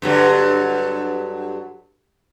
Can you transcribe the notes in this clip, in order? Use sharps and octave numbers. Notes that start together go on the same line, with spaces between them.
G2 D3 F#3